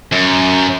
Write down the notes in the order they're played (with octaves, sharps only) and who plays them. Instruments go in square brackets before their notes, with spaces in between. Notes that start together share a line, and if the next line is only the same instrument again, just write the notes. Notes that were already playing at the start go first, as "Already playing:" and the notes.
[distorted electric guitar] F#2